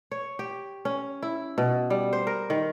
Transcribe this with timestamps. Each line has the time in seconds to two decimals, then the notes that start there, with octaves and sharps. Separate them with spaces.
0.11 C#5
0.39 G4
0.85 C#4
1.23 E4
1.58 B2
1.90 G3
2.13 C5
2.27 A#4
2.50 D#3